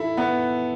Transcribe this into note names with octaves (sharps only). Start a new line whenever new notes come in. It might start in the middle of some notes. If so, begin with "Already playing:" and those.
Already playing: E4 A4
B3